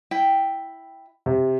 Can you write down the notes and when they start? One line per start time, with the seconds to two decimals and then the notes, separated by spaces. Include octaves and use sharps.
0.11 E4 G5
1.26 C3